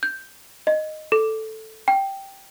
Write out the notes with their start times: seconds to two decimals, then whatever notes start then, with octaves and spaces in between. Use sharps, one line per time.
0.03 G6
0.67 D#5
1.12 A4
1.88 G5